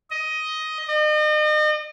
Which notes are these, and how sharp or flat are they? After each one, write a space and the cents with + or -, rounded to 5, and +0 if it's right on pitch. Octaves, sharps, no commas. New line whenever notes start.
D#5 +10
D#5 -40